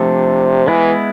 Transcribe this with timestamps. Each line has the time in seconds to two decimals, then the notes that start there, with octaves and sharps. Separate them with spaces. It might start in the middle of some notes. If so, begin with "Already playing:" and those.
Already playing: C3 F3 A3 D4 A4
0.68 E3 G#3 B3 E4